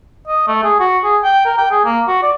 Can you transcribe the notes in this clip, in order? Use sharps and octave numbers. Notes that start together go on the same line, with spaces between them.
D#5
A3
G#4
F#4
G#4
G5
A#4
G5
G#4
A#3
F#4
D5